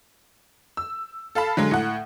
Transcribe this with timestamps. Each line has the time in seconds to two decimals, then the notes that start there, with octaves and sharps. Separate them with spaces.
0.77 E6
1.35 A4 F5 A5 B5
1.57 D3 F#3 G#3
1.71 A2 F#5